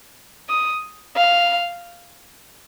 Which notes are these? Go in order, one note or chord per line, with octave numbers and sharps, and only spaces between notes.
D#6
F5